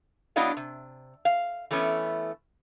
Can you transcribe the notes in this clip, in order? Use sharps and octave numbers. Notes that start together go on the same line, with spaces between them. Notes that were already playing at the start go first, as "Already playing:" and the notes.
F#3 B3 D4 E4 D#5 F5
C3
F5
E3 A3 B3 C#4